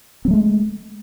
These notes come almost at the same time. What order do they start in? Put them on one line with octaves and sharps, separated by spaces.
C4 F#3 A3 G#3